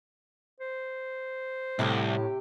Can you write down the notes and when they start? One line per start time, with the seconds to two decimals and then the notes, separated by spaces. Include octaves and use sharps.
0.60 C5
1.79 C2 A2 C3 G4